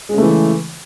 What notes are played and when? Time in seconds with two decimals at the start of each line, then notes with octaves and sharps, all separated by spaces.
0.09 G#3
0.13 C#3
0.18 A3
0.22 E3